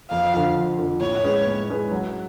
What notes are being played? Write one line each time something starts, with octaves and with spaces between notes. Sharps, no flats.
F2 F5
D3 F3
F2
D3 F3
A2 C#5
G#3 C#4 G#4 B4
A2
G#3 C#4 G#4 B4
F#3